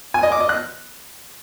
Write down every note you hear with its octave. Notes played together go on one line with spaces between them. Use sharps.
G#5
D#5
D6
D#5
F#6